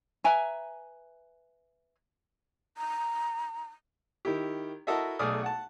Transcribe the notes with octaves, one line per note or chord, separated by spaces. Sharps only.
B4 E5 G#5 A#5
A#5
D#3 E4 G4
E4 F#4 A4 A#4 D#5 E5
B1 A3 G#4 D5 D#6 F6
F#5 A5